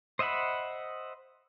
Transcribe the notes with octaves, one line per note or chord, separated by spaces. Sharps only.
C5 D#5 E5 F#5 B5